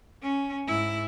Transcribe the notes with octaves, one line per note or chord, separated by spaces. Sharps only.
C#4
G#2 E4